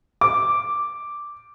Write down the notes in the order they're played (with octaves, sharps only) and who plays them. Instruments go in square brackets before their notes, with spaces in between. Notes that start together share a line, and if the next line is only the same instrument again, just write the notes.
[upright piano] D6